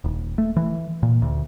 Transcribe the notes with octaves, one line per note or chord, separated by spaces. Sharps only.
D#1
A3
E3
A#2
D2